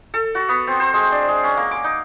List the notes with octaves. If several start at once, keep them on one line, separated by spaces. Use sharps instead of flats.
A4
F#4
B3
C4
C5
G#3
D4
G#3
C#4
A#3
D6
D#4